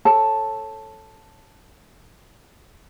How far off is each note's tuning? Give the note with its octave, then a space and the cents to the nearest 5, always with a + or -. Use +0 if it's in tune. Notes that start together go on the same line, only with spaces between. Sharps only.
A4 +0 C#5 -20 A5 +0